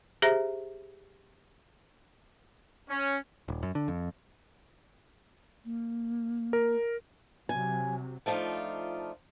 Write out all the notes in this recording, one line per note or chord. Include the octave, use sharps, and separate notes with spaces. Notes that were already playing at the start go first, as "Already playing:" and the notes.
G4 G#4 C5 E5 A#5 A#6
C#4
D#1
F#2
D3
F2
A#3
A#4
C3 F#3 G#5
F3 A3 D4 D#4 F4